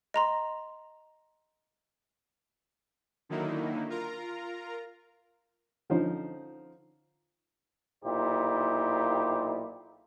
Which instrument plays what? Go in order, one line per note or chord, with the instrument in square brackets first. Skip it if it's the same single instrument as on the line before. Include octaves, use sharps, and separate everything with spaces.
[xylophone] D#5 A#5 C6
[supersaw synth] D3 D#3 F#3 A#3 D#4 E4
F4 A#4 A#5
[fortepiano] D3 F3 C#4 D#4 C5
[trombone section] B1 A#2 D#4 E4 G4 C5